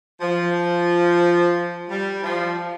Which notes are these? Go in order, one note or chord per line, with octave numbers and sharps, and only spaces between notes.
F3
G3
F3